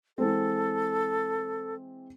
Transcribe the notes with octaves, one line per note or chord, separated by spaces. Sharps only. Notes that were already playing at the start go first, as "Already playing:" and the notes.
E3 G#3 C4 A4